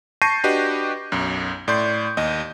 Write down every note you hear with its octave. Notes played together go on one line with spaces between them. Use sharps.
A5 C#6 G6 A#6 C7 D#7
D4 F#4 G4 B4 D#5
B1 F#2
A2 D5 C6 G6
D#2 D#5